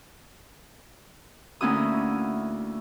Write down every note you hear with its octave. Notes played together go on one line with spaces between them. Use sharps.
D2 A#3 C#4 E4 F#4 D#6